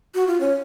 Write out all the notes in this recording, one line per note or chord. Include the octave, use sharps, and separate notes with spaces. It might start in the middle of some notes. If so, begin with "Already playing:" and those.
F#4
F4
C#4